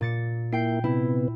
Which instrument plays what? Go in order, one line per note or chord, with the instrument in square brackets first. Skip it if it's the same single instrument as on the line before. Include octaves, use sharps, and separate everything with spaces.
[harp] A#2 A6 C#7
[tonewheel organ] A#3 E4 [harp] G5 C7
[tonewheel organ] C3 B3 [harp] E4